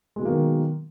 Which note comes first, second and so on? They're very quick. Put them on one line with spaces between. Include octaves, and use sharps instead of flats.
G#3 B2 F#3 A#3 D#3